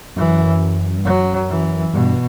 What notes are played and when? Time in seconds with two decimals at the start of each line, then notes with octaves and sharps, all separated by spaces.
0.16 F#2 E3
0.99 G2
1.05 F#2 F#3
1.49 E3
1.94 G2 B2